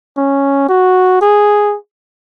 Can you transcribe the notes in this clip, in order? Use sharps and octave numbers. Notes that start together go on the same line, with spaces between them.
C#4
F#4
G#4